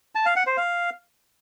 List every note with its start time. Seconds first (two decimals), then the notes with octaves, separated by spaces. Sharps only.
0.15 A5
0.26 F5
0.36 F#5
0.47 C5
0.57 F5